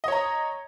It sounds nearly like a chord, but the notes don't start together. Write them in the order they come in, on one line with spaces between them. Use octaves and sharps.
D#5 C#5 A#5